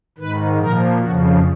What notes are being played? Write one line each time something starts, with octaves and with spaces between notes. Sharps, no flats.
G#2 D#3 B4
A#2 F3 A#4
F2 C#3 F3 F#4